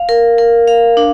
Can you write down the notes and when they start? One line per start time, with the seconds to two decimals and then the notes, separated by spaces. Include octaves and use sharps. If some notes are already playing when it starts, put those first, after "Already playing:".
Already playing: F5
0.09 A#4
0.38 A#4
0.68 F5
0.97 D4